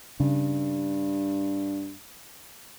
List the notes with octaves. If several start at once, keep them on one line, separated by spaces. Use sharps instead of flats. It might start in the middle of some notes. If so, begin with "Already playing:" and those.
G2 C#3